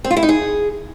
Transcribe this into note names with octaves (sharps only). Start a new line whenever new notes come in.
C4
F4
E4
D#4
G#4